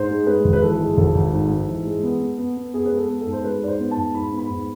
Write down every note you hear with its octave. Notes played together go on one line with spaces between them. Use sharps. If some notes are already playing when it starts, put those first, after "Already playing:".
Already playing: G#2 C5
G#3
G#3 B4
G#1
B4
E3 A4
G#3
G#1 A4
G#1
G#2
G#2
E3
G#3
B3
B3
B3
B3
B3 G#4
B4
G#3
A4
B3
A4
G#2
C5
G#3 B4
G#2 D5
C5
B3
A5
G#2
G#2 B5
B3
B5
G#2